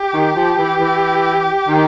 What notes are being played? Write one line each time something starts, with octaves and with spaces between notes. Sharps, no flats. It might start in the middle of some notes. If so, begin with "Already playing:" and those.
Already playing: G4
D#3
F3
E3
E3
D#3